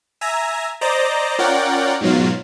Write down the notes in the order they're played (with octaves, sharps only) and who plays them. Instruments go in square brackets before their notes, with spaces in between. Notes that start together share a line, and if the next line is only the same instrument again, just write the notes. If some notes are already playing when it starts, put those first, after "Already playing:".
[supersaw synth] E5 G#5 A#5
C5 D5 D#5 A#5
C#4 F4 A#4 D5 F#5 G5
G#2 B2 F#3 F4